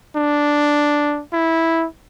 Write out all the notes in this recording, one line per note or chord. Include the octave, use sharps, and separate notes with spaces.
D4
E4